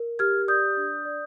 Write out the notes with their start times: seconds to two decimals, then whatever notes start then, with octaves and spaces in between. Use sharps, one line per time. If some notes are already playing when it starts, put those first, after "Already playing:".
Already playing: A#4
0.19 G4 F6 G#6
0.48 D5 D#6 G6
0.77 D4
1.05 D5